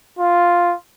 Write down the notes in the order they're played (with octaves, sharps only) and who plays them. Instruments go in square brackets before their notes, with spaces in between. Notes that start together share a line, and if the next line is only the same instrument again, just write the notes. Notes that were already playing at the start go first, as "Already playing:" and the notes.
[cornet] F4